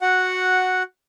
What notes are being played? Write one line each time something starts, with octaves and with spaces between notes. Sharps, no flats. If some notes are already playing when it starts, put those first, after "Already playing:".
F#4 F#5